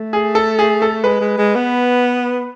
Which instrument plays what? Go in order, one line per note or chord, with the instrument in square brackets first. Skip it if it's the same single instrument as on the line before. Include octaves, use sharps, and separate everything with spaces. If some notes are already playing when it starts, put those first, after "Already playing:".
Already playing: [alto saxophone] A3
[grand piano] G#4
A4
G#4
A4
[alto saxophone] G#3 [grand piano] B4
[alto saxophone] G#3
G#3
B3